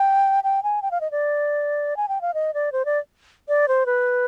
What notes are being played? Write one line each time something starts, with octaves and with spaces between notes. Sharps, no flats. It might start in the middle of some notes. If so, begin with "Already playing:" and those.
Already playing: G5
G5
G#5
G5
F5
D#5
D5
G#5
G5
F5
D#5
D5
C5
D5
D5
C5
B4